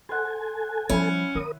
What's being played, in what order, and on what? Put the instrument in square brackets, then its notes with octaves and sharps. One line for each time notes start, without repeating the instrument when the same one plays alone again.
[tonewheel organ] A4 G#5 [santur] C5 F#5
[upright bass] F3 G3 [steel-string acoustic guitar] C#4 [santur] E4 B5
[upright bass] D#3 [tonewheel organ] A#4 D#6